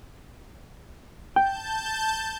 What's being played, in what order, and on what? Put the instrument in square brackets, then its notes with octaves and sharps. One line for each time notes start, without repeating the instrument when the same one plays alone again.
[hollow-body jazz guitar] G5 [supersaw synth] A5 G6